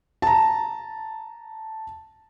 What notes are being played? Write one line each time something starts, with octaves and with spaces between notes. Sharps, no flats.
A5 A#5